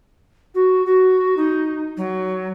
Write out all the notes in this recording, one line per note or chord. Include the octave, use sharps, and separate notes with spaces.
F#4
F#4
D#4
F#3